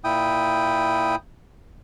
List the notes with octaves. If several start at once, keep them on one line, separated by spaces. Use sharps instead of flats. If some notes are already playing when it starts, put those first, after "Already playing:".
A#2 E4 G5 D#6